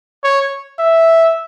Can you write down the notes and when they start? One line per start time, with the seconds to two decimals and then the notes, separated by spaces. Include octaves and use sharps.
0.24 C#5
0.79 E5